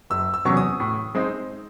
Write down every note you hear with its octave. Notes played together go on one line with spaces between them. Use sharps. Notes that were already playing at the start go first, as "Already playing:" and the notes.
F#1 E6
E6
E2 C3 F#3 C#4 C#6
D#6
A2
G#3 C4 D#4